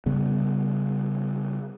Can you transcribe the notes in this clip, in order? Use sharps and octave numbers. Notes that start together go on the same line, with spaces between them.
C#3 G3 B3